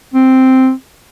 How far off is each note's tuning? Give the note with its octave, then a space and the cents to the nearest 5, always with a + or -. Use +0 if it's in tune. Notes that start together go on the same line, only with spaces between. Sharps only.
C4 +0